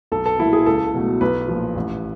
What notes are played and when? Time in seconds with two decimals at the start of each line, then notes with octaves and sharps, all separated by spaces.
0.12 B1 A4
0.26 A4
0.39 A#2 F#3 A#3 E4
0.53 G#4
0.66 C#2 A4
0.94 B2 F#3 A3
1.21 B1 B4
1.48 A#2 F3
1.76 A1